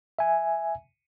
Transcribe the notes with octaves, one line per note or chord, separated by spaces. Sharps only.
E5 G#5